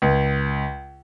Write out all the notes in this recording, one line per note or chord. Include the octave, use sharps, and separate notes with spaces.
C#2